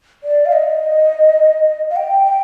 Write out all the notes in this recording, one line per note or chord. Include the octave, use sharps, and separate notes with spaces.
D5
F5
D#5
F5
G5
G5